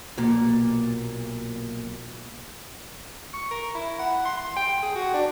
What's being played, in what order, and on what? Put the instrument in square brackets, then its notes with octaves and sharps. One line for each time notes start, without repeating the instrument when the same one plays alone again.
[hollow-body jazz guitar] B1 A#2
[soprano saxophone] C#6
A#4
E4
F#5
C6
C6
G5
G#4
F#4
D4